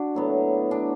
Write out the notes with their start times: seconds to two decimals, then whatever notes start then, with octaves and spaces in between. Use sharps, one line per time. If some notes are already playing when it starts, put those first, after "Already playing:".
Already playing: D4 F#4
0.15 A2 F#3 B3
0.71 D4